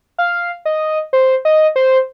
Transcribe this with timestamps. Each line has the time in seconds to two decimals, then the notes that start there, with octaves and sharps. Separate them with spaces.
0.18 F5
0.65 D#5
1.13 C5
1.45 D#5
1.76 C5